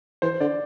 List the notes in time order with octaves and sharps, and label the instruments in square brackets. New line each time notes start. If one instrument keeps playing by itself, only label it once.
[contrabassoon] E3 [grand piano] C5
[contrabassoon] D3 [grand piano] D5